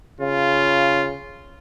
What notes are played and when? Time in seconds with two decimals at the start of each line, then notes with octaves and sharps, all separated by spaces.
0.20 C#3 F4